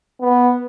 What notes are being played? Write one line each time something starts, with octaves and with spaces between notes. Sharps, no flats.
B3